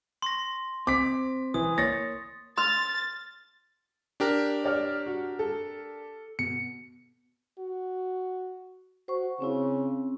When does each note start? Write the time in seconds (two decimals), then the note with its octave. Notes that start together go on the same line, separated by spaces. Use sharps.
0.22 C6 C#6 A#6
0.87 C4 D6 B6
1.54 E3 D#6
1.78 A#3 C#5 A6 A#6
2.57 C6 F6 A6
4.20 D4 G4 A#4
4.64 C#5 D5 F6
5.06 F#4
5.39 A4
6.39 B2 C#7
7.59 F#4
9.08 F#4 C5 C#6
9.40 C#3 C4 C#4 E4